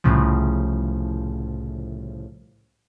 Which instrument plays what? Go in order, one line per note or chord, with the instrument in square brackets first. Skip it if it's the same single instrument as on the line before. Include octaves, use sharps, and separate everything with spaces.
[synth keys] C2 A2 C#3 F3